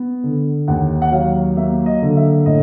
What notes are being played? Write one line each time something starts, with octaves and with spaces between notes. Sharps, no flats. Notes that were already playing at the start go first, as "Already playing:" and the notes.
Already playing: B3
D3
D#2 F#5
F#5
F#3 F5
A#3 E5
D#5
D3
E5
A2 D#5